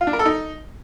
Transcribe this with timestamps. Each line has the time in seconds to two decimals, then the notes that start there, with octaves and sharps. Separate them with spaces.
0.01 F4
0.07 D4
0.13 A#4
0.19 A4
0.26 D#4